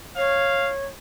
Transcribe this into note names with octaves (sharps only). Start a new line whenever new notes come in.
C#5 F5